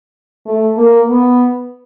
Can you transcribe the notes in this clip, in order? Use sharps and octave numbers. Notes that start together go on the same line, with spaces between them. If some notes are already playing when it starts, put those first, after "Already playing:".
A3
A#3
B3